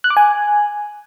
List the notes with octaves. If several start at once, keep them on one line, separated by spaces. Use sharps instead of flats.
F#6
D6
G#5